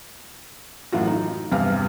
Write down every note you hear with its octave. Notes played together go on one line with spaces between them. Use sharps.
F#2 A2 E3 F4 F#4
D#4
E2 G2 C3 F5 F6